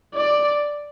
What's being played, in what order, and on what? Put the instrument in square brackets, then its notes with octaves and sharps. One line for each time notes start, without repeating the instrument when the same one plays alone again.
[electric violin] D5